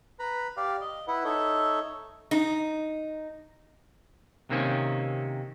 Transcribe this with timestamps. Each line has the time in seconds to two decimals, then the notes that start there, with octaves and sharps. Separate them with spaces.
0.19 B4 A#5 B5
0.57 G4 D5 F5
0.81 D#5
1.08 E4 B4 F#5
1.24 D#4 A4 C#5 D#5 E5
2.31 D#4
4.50 C3 D#3 A#3 C4 C#4